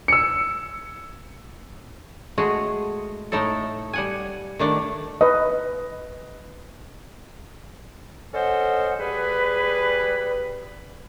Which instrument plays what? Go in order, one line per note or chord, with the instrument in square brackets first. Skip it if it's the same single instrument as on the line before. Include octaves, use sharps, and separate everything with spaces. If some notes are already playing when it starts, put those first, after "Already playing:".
[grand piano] E6 C#7
[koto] G#3 A3 F#4 G#4
A2 A3 D#4 E4 A4
G3 F#5 G#5
D#3 A3 D4 E4
[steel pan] B4 D#5
[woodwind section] C#4 A4 C5 D#5 F#5
G3 G#4 B4